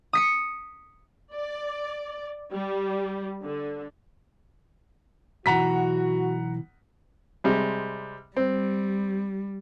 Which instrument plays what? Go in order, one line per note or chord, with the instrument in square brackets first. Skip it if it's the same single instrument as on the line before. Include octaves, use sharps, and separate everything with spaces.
[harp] D#6 B6 C#7
[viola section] D5
G3
D3
[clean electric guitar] B1 E3 [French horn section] F#4 [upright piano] F#5 A#5 B6
[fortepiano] C3 G3 G#3
[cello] G3 [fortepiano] C4